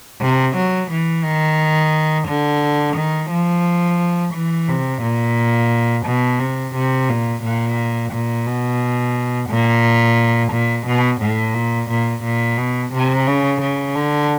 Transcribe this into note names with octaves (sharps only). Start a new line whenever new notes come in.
C3
F#3
E3
D#3
D3
D#3
F3
E3
C3
A#2
B2
C3
C3
A#2
A#2
A#2
B2
A#2
A#2
B2
A2
A#2
A#2
A#2
B2
C3
C#3
C#3
D3